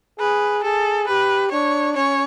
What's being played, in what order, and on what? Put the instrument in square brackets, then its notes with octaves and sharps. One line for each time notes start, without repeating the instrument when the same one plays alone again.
[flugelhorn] G#4 [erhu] B4
[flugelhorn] G#4 [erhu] A4
[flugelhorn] G4 [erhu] B4
[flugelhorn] D4 [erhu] C#5
[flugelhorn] C#4 [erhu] C#5